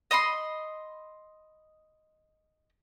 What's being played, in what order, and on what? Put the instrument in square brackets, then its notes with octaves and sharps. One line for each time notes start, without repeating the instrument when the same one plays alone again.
[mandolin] D#5 E5 B5 C6